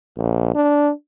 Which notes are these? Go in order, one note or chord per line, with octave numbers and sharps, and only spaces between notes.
A#1
D4